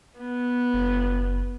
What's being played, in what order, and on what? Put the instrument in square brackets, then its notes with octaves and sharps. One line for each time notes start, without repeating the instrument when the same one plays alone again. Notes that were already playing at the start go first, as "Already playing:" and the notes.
[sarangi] B3
[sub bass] F#1